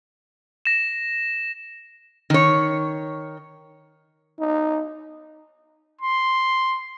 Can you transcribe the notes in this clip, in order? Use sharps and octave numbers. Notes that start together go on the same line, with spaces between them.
A#6 E7
D#3 C#5
D#4
C6